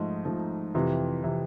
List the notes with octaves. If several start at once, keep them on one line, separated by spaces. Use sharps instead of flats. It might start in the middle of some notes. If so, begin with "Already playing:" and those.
Already playing: G#2 F3 A3 D#4
G#2 F3 A3
F2 C3 E3
C3 E3